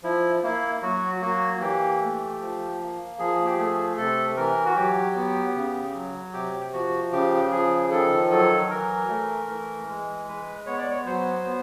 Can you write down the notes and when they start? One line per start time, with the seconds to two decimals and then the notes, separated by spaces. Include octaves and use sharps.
0.03 F3 E4
0.43 A#3 E4
0.82 F#3 F#4
1.21 A#3 F#4
1.61 E3 G4
2.01 A3
2.40 F3
2.79 A#3
3.19 F3 G#4
3.46 G4
3.58 A3 G#4
3.98 C3 A4
4.37 E3 A#4
4.66 F#4
4.76 F#3 G4
5.16 B3
5.55 C#3
5.94 F#3
6.33 C3 G4
6.73 F3 F#4
7.12 C#3 G4
7.51 F3 G#4
7.83 G#4
7.91 D#3 A4
8.30 F#3 A4
8.70 E3 A#4
9.09 A3
9.49 E3
9.88 G#3
10.28 G#3 B4
10.66 B3 C#5
10.78 D5
10.90 C#5
11.06 F#3 C5
11.45 B3